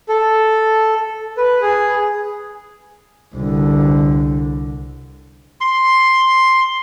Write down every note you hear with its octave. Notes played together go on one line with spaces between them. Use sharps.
A4
B4
G#4
C2 D3
C6